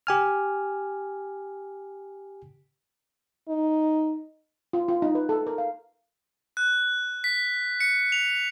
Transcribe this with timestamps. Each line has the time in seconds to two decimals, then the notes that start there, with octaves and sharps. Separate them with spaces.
0.07 G4 G#5 F6
3.49 D#4
4.73 F4
4.89 F4
5.02 D#4
5.15 B4
5.29 A4
5.47 A#4
5.58 F5
6.57 F#6
7.24 B6
7.80 C#7
8.12 F7